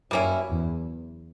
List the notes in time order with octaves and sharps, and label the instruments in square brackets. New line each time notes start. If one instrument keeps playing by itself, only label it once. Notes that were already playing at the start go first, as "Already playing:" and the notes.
[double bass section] F#2 [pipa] G3 A#3 C#4 E4
[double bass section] E2